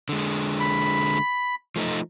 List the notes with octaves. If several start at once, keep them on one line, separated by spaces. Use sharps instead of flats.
D3 G#3
B5
F3 A3 D#4